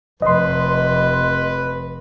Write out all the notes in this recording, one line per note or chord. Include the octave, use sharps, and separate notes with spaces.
F1 B4 D#5 C6